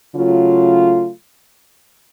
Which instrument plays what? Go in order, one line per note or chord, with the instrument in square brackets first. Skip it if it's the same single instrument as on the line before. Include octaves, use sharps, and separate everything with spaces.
[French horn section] C#3 F#3 A3 F4